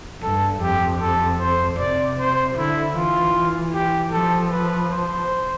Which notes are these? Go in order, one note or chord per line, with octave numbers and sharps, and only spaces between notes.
G2 A4
F2 G4
A4
C5
C3 D5
C5
D3 E4
E3 F4
G4
F3 A4
B4
C5